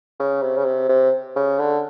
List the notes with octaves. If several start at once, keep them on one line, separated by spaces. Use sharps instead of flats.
C#3
C3
C#3
C3
C3
C#3
D3